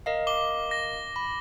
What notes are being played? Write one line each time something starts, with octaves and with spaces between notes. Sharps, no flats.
A#4 D#5 F5
D6 G7
A#6
B5